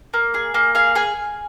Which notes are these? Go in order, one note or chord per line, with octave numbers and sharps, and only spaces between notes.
A#3
G#4
A#3
G#4 F5
G#4 G#5